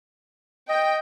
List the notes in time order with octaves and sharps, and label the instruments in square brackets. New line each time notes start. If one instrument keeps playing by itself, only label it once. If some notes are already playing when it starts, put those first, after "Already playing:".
[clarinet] D#5 [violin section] G5